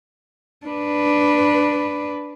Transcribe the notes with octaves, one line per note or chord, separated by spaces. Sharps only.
D4 B4